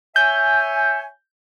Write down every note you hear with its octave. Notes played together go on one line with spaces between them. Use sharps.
C#5 E5 G#5 G6